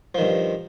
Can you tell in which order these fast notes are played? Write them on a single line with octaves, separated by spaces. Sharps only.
F3 D#3 G2